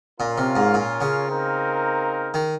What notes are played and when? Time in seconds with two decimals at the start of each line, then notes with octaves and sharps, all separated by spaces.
0.20 A#2 C#4 F4 A#4 F5
0.38 C3
0.56 G#2
0.74 A#2
1.01 C#3
1.28 C4 D#4 A#4 F5
2.34 D#3